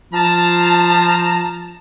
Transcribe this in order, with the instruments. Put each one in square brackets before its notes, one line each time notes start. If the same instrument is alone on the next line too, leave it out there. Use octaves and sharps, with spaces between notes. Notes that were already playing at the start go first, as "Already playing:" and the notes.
[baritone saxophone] F3 [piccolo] A5 [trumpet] A#5